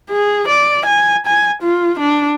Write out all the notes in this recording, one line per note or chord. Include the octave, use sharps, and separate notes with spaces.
G#4
D5
G#5
G#5
F4
D4